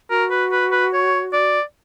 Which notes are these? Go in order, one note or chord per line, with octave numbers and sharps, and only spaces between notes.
F#4 A#4
B4
B4
B4
C#5
D5